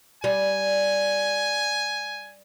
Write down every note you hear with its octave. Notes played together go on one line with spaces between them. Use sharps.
G3 G#5